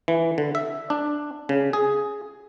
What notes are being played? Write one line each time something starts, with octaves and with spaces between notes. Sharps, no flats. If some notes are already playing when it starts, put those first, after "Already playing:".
E3
D3
E5
D4
C#3
G#4